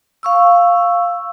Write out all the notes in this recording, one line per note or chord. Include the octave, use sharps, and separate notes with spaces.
F5 C#6 E6